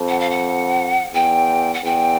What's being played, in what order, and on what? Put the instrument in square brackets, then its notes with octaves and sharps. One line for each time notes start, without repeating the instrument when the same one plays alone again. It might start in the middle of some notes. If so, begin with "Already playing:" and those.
Already playing: [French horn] F2
[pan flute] F#5
F5
F#5
[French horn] E2 [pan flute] G5
[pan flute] F#5
[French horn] E2 [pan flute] G5